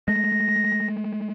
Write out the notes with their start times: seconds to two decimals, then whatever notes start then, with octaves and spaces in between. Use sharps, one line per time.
0.08 G#3 A3 A#6